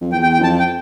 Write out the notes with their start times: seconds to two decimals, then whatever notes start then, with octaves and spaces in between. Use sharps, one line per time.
0.01 F2
0.12 E2 G5
0.23 G5
0.33 G5
0.39 F#2
0.43 F2 A5
0.59 G5